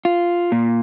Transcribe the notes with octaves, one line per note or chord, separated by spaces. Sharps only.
F4
A#2